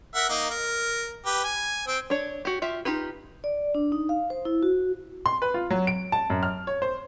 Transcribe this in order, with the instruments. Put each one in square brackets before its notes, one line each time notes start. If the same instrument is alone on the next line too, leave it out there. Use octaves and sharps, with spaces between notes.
[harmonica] A#4 E5 F#5
A#3 D#4
A#4
G4 B4
G#5
C4 G5
[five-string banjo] D4 C#5
F#4 G4
F4 G4 E5
D#4 F4 G4 B4
[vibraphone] D5
D4
D#4
F5
C5
E4
F#4
[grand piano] C6
B4
F4
F#3
D7
A5
F#2
F6
C#5
C5